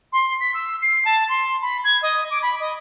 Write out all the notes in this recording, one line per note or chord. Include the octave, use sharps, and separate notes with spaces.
C6
B6
E6
C7
A5
C6
B5
G#6
D#5
D6
B5
D#5